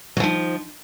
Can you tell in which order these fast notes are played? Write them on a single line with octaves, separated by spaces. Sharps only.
F#3 F3 D#3